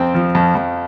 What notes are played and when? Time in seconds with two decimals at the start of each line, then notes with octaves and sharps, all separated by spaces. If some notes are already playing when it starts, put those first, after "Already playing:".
Already playing: F2 C4 G5
0.14 F3
0.35 F2
0.55 F2